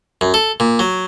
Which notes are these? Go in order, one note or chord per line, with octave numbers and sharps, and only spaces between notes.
F#2
A4
A#2
F#3